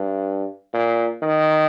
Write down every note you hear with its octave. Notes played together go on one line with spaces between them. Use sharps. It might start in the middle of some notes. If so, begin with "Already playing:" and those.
Already playing: G2
A#2
D#3